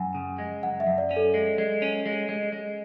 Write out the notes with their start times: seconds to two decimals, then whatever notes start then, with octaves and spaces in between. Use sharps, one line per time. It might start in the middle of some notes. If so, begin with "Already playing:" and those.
Already playing: F#2 F#5 G#5
0.15 C#3
0.38 G#3
0.63 F#2 F#5
0.80 E5
0.87 F#2
0.98 D5
1.11 C#4
1.16 A4
1.34 G#3
1.58 G#3
1.82 C#4
2.06 G#3
2.29 G#3
2.52 G#3